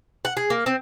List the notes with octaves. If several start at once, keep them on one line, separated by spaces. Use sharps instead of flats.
F#5
G#4
A#3
C4